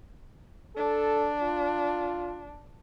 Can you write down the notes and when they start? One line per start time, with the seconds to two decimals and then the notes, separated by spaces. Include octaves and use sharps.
0.76 D4 A4
1.41 F4